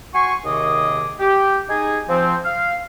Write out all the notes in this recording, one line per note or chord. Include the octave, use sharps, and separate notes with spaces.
F#4 G#5 C6 C#6
D#2 C3 D#3 G#4 D#5 D6
G4
D#4 G#4 G#5
F3 C4
F5